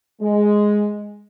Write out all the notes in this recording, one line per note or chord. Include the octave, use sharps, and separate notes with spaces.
G#3